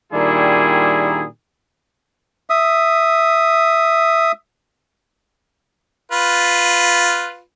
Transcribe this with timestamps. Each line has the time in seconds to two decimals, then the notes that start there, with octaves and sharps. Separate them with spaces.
0.13 A#2 D#3 G3 D4 E4 G#4
2.50 E5 D#6
6.12 F4 B4